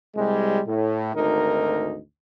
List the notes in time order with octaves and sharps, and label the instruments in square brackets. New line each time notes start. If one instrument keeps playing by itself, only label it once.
[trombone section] C2 G3 G#3
A2
G#1 D2 D#4 A#4